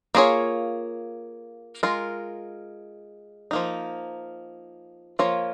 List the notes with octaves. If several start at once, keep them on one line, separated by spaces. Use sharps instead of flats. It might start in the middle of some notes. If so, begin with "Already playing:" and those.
A#3 F4 G#4 C#5
G#3 F4 A#4
F3 A#3 D#4
F3 A#3 F4 C#5